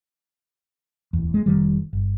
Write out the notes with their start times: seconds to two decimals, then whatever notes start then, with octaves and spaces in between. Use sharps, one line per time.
1.13 D1 E2
1.34 G#3
1.46 F1 D#3 G3
1.93 G1